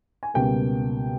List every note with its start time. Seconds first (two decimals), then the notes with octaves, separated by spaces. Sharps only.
0.23 G#5
0.34 C#2 B2 G3 A#3 G5